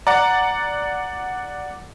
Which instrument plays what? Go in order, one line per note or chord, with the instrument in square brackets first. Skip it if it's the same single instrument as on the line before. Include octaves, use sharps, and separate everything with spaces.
[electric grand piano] D5 F#5 [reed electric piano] A#5